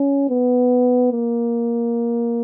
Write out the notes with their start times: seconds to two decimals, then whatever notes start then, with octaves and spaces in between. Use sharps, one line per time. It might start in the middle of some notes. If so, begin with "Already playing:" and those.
Already playing: C#4
0.29 B3
1.12 A#3